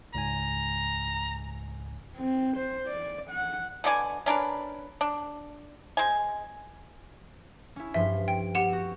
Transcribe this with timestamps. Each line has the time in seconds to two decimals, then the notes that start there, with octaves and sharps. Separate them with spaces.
0.15 C#2 G#2 G#5 A#5
2.17 C4
2.57 C5
2.87 D5
3.31 F#5
3.84 B2 D3 D5 G#5
4.26 C#4 D4 A#4 B4
5.01 D4
5.97 G#3 C5 G#5
7.76 C#4 E4
7.94 G2 F3 E5 C6
8.28 G5
8.55 B3 G4 F#5 E7
8.69 C4 F#4